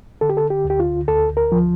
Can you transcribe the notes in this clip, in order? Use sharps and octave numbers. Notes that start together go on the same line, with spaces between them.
D3 A4
G4
A4
G4
D2
G4
F4
D2 A4
A#4
F3